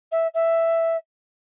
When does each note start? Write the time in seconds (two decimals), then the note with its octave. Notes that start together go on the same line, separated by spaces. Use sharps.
0.11 E5
0.34 E5